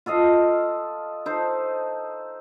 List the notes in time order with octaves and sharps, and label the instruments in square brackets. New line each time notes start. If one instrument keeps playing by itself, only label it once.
[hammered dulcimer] F4 A4 D#5 F5
D#4 A4 C5